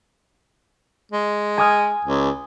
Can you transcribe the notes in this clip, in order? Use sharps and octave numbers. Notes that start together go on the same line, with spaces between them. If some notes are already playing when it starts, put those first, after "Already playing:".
G#3
G#5 D#6 F6
C#2